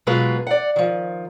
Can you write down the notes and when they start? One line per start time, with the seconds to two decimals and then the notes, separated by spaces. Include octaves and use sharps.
0.07 B2 F#3 G#3 F4 G#4 B4
0.47 D5 F#5
0.76 D#3 F3